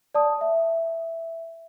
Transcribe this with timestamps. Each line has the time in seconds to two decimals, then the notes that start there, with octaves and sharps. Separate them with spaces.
0.15 D5 A5 D#6
0.41 E5